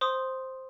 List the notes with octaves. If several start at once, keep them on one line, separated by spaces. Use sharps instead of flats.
C5 C6 D#6